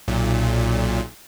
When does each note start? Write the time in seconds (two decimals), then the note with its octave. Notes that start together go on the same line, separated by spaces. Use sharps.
0.08 B1 A#2